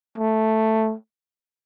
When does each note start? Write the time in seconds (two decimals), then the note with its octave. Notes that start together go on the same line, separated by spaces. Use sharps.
0.18 A3